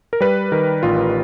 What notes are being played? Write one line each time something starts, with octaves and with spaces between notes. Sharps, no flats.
A#4
G3 B4
D#3 A#4
A1 F4